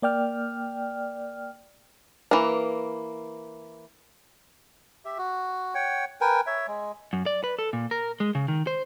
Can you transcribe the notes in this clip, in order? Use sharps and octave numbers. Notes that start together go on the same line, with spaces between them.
A#3 D5 G5 F6
E3 A#3
G4 E5
F#4
C#5 F#5 G5
A#4 B4 G5 G#5
C#5 E5
G#3
F#2
D5
B4
A4
A#2
A#4
G#3
C#3
D#3
C5